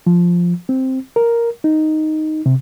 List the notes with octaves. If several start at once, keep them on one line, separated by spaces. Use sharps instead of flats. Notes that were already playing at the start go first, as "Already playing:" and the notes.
F3
C4
A#4
D#4
C3